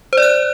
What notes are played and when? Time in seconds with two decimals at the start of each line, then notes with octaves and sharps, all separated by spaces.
0.13 C5
0.17 D5
0.22 F#6